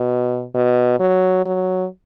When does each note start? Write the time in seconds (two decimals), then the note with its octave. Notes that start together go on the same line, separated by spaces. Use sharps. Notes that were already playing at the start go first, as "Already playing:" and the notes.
Already playing: B2
0.55 B2
1.00 F#3
1.45 F#3